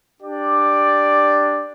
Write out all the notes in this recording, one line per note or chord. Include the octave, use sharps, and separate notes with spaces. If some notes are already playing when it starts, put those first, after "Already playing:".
D4 G4 D5